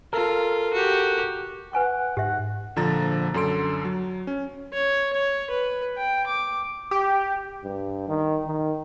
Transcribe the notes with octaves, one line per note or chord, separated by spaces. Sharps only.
F4 A4 A#4
F#4 G4
B4 F#5 G#5 C#6
G#2 G4 E5 F#5
A#1 D3 F3 A#5 A6
F#2 D3 A4 C6 D7
F#3
C#4
C#5
C#5
B4
G5
D6
G4
G2
D#3
D#3